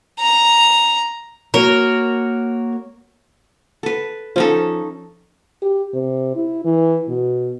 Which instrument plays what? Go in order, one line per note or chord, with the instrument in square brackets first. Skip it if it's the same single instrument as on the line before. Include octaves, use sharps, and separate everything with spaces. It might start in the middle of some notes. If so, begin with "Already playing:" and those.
[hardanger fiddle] A#5
[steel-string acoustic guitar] A#3 F#4 C#5 [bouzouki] A#4
[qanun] A4 B4
[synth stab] F3 [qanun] C#4 D#4 A4
[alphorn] G4
C3
E4
E3
B2